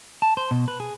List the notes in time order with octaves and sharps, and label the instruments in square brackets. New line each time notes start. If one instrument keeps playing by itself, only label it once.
[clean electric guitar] A5
C5
B2
B4
G#4